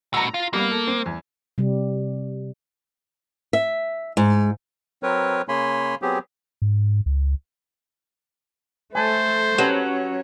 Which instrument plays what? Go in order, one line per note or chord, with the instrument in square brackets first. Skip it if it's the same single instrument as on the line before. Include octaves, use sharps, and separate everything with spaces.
[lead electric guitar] A2 F#4 [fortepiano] A#5 E6
[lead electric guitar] F4
[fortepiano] G3 B3 F5 [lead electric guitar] A#3
[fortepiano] A4
C4
E2
[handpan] C3 G3
[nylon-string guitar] E5
G#2
[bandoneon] F#3 C4 A#4 B4 C#5
C#3 A#3 C#5 G#5 B5 C6
F#3 B3 C4 G4 G#4
[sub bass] G#2
C#2
[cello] A3 A4 [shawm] C5 [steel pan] G#5 A5
[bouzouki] F#3 [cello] C#4 [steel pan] G4 B4 A5